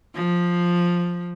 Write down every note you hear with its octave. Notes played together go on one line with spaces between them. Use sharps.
F3